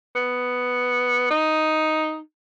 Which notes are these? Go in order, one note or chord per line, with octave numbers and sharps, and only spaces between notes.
B3
D#4